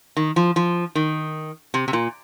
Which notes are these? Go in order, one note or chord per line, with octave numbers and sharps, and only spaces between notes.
D#3
F3
F3
D#3
C3
C3
A#2